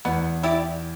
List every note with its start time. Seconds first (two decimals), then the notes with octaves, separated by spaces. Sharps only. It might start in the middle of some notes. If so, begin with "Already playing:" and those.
0.05 E2 B3
0.43 E4 G4 D5